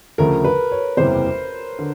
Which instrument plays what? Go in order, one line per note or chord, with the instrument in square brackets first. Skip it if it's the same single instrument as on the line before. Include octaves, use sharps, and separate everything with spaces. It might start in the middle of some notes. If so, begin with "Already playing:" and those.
[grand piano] D2 C#3 F3 A3 [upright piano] A#4
[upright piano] B4
C#5
[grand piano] F#1 E2 C3 E3 G3 [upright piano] C5
[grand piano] D3